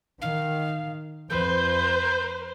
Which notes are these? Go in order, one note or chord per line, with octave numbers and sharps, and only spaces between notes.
D#3 F5
F2 B4 C5 G6